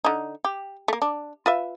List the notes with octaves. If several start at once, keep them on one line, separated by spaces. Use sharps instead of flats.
D3 D#4
G4
A3 A#3
D4
F4 B4 E5